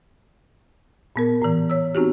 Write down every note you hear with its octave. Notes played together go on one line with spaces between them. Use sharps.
A#2 B3 A#4
A2 E3
C#5 E6
B3 C4 D#4 F#4 G4